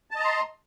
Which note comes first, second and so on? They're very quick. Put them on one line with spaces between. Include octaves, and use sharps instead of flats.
A5 D#5 A#5 C6